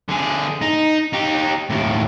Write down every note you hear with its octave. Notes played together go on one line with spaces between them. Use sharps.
D3 G#4
D#4
D#4 G4
D#2 A2